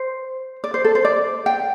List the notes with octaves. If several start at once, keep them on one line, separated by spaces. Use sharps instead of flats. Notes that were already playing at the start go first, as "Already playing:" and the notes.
Already playing: C5
D5
C5
A4
C5
D5
G5